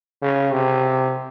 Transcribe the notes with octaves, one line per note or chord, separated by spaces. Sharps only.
C#3
C3